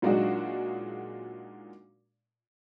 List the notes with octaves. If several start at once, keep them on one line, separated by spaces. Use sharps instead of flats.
A#2 F#3 G#3 D4 D#4 F#4